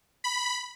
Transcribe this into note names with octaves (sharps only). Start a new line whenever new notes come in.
B5